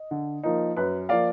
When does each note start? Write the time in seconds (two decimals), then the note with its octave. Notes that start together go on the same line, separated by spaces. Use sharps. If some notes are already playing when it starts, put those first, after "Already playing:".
Already playing: D#5
0.11 D3
0.43 F3 A#3 D#4
0.77 F#2 B4
1.09 F3 A#3 D5 F5